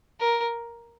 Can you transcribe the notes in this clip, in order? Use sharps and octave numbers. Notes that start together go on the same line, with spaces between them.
A#4